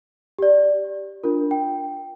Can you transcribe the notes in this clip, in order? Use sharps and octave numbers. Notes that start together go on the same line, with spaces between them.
G4 D5
D4 F4 A#4
G5